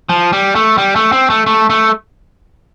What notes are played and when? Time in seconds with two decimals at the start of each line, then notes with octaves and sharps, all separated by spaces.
0.09 F3
0.33 G3
0.55 A3
0.78 G3
0.95 A3
1.12 C4
1.30 A3
1.46 A3
1.70 A3